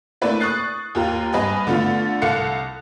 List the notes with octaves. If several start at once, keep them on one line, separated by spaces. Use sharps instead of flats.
A3 A#3 D4 E4 B4 D5
C#6 D#6 F#6 A6 C7
D#2 F4 G4 A#5
G2 B4 D#5 G#5
D3 A3 B3 F4
C2 A4 F5 F#6 C#7